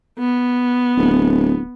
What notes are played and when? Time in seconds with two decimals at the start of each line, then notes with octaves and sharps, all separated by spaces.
0.19 B3
0.97 D1